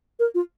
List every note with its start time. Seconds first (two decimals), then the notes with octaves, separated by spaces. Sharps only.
0.19 A#4
0.35 F4